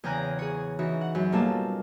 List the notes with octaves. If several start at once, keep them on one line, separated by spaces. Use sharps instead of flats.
E2 C#3 G5 G#5 A#5 F#6
G#4 C#5
E3 D#4 F#4
F#5
F#2
B2 G3 A#3 F4 A4 A5